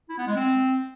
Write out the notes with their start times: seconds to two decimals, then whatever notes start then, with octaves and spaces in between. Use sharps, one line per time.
0.09 E4
0.18 B3
0.27 G#3
0.36 C4